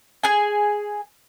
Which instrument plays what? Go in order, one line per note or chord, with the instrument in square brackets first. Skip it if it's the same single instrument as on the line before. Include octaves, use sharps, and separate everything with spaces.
[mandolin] G#4 G#5